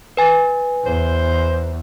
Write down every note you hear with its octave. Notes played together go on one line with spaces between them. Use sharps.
B4 G#5 A6
E2 C5